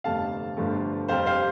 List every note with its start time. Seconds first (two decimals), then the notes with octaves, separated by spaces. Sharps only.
0.04 G1 F2 C3 A3 F5 A5
0.57 G1 G2 F3 A3
1.08 F2 C3 G3 C5 F5
1.26 C5 F5